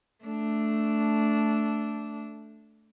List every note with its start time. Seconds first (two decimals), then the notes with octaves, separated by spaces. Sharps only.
0.24 A3 D4